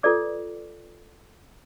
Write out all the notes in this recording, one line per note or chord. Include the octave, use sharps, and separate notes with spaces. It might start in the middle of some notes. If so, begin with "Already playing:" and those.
F4 A4 B4 D5 D6